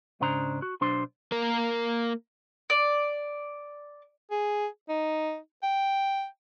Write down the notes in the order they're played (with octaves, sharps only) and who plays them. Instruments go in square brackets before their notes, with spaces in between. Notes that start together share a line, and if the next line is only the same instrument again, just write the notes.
[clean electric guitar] G#2 C#3 D4 C5 A#5
F#4
B1 F#3 D4 C5 C6
[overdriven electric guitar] A#3 A#4
[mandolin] D5
[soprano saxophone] G#4
D#4
G5